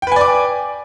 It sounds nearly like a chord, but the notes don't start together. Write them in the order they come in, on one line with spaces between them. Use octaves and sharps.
G5 B4 G#5 D5 D6